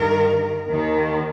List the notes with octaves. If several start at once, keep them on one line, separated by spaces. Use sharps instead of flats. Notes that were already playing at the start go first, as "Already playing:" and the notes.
Already playing: G2 D#3 A#4
D#2 D#3